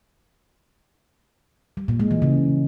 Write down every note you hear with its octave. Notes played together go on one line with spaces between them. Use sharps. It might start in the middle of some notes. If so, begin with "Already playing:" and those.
G3
A#2
G#3
E3
C#3